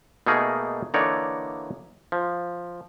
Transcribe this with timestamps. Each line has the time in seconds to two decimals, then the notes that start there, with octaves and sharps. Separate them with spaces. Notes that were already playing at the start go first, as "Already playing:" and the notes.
0.26 B2 A3 A#3 D#4 G#4 A#4
0.94 D3 E3 A#3 D#4 C#5 D5
2.12 F3